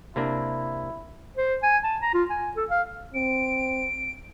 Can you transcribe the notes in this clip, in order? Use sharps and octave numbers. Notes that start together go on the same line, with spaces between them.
C3 A#3 D4 E4
C5
G#5
A5
A#5
F4
G#5
A4
F5
C4 D7